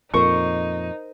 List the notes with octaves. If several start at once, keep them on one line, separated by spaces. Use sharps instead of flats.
F2 A#2 D#4 A#4 C5 C#6